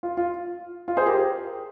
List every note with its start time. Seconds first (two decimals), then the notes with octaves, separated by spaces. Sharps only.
0.03 F4
0.17 F4
0.88 F4
0.97 G#4 C5
1.06 G4 A#4